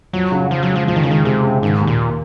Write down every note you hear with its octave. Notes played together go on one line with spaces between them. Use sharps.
F2 F#3
C#3
C#3 F3
F#3
G#3
F3
F2 F3
D#3
C#3
G#3
D#3
C3 G#3
C#3
G#2 D#3
D#2
A#2